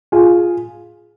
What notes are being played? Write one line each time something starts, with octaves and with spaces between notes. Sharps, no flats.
F4 G#4